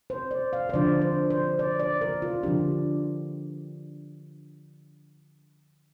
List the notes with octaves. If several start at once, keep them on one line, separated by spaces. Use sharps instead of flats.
C5
D5
F5
C5
D3 F3 D4 F4 D5
C5
C5
D5
D5
A#4
F4
D3 F3 D4 G4